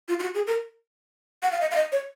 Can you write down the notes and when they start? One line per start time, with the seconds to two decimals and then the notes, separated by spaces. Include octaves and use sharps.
0.08 F4
0.19 F4
0.23 F#4
0.34 G#4
0.47 A#4
1.43 F#5
1.51 F5
1.61 D#5
1.71 F5
1.76 D#5
1.92 C#5